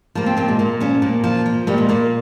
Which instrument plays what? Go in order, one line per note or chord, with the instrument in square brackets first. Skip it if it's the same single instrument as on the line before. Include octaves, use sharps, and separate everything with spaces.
[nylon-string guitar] F3 A#3
C4
A#2 C4
G#3
A#2 A#3
F3 C#4
A#2 A#3
F3
F3
A#2 G3
G#3
A#2 A#3